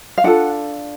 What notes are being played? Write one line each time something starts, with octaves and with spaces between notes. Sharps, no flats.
F5
D4 F4 A4 F#5